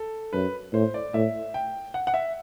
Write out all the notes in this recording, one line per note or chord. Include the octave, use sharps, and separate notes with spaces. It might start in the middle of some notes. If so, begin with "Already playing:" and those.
Already playing: A4
F#2 B4
A2 C5
D5
A2 E5
G5
F#5
F#5
E5